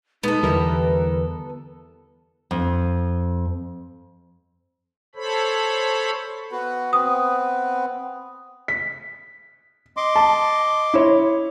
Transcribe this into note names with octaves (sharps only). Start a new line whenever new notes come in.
B2 G#3 B3 D#4 A4
E2 D3 E3 G3 E4 A#4 B4
F2
A4 C5 C#5 B5
B3 F#4 B4
B3 C4 B4 D#6
B6
D#5 C6 D6
A5
E4 C#5